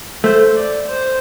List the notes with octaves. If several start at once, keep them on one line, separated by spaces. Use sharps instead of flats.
A3 C5
D5
C5